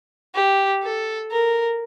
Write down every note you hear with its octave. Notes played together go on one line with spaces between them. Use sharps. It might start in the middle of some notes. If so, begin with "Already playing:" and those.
G4
A4
A#4